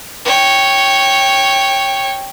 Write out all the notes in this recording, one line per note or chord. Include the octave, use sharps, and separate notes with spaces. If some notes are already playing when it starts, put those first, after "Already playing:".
C#5 G5